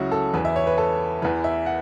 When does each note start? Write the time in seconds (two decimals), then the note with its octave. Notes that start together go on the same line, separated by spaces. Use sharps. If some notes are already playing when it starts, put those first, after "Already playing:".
Already playing: C#2 C#3 F#3 C#4 E4 F#4
0.12 A4
0.34 E2 E3 B4
0.45 E5
0.56 C#5
0.67 B4
0.78 A4
1.22 E2 E3 B4
1.44 E5
1.66 F#5